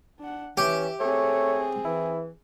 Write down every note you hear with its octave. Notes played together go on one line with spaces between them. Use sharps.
D4 F#5
E3 C#4 G4 E5
A3 C4 G#4 C#5
E3 E4